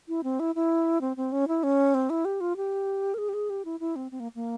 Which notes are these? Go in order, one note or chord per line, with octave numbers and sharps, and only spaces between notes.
E4
C4
E4
E4
C4
C4
C#4
E4
C#4
C4
E4
G4
F4
G4
A#4
G#4
G4
G#4
G4
E4
E4
C4
C4
A#3
A#3